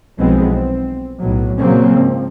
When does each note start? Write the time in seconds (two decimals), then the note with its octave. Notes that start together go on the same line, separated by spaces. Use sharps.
0.18 B1 E3 F3 G#3 B3 C4
0.53 C4
1.18 B1 A2 F#3
1.57 A#2 C#3 F#3 A#3 C4 C#4
1.96 G#2 F3